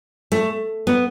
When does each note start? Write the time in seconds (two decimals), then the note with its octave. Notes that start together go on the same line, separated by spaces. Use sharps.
0.32 A3
0.87 B3